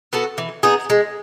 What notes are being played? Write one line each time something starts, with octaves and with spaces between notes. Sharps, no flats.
B3 F#4 A4
E3
B3 D#4 G#4
G#3